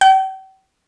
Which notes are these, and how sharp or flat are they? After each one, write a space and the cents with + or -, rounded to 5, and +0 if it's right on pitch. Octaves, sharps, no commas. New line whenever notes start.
G5 -45